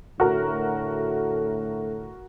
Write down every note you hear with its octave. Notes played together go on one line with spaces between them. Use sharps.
A2 D3 A3 F#4 A#4